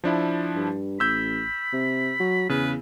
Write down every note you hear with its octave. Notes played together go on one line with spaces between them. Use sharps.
F3 D4 E4
G2
A1 B5 E6 G6
C3
F#3
E2 C#3 B4